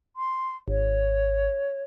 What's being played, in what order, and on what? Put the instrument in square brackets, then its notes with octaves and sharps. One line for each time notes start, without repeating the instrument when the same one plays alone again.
[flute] C6
[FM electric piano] G#1 [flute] C#5